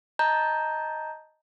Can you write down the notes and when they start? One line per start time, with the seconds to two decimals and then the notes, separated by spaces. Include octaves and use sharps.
0.19 D#5 A5 A#5 G6